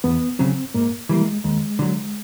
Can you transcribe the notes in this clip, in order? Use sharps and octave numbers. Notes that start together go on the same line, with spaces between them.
E2 B3
C#3 F#3 C4
G#2 A#3
E3 G3 A#3
G#3
D#2 G#3
D3 F#3